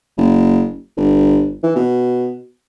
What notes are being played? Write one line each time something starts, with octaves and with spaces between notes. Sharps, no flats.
F#1
G1
E3
B2